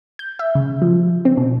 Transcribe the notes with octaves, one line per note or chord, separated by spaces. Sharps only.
G6
E5
C#3
F3
C4
B2